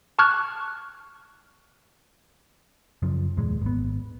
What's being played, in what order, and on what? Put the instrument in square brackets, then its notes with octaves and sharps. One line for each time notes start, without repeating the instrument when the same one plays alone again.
[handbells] A5 C#6 D6 F6 F#6 G#6
[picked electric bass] F#2 C#3 F3
D#2 A#2 G#3
G#1 B3